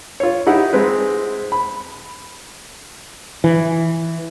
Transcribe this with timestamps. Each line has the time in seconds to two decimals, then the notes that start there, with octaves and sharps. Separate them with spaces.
0.20 F4 C#5
0.47 D#4 E4 G4 F#5
0.73 G#3 C4 B4
1.52 B5
3.44 E3